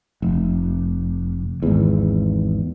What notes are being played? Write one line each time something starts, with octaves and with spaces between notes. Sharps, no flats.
F1
G#1 E2